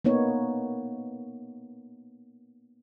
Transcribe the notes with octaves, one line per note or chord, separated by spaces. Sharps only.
A#3 B3 D#4 C#5